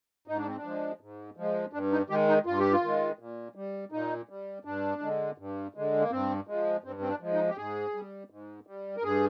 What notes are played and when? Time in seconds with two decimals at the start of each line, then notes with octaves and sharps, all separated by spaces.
0.27 G#2 D#4
0.37 D4
0.47 C4
0.57 D4
0.64 F3 G#3
1.01 G#2
1.37 F3 G#3
1.73 G2 D4
1.92 D#4
2.10 D#3 G#3 G4
2.28 D#4
2.46 G2 F4
2.60 G4
2.73 F4
2.82 D#3 G#3
3.19 A#2
3.55 G3
3.92 A#2 D#4
4.29 G3
4.65 G2 D4
5.02 D3 G#3
5.38 G2
5.75 D3 G#3
6.00 A#3
6.11 G2 C4
6.47 F3 G#3
6.84 G2 C4
7.02 C4
7.08 D4
7.21 F3 G#3
7.33 D#4
7.49 G4
7.57 G#2 G#4
7.94 G3
8.30 G#2
8.67 G3
8.97 A#4
9.03 G2 G#4